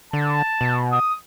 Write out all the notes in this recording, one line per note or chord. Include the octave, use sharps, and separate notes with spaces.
D3 A5
B2
D#6